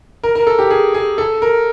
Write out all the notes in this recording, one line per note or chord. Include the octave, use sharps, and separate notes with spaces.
A#4
A#4
A4
G4
G#4
G#4
A4
A#4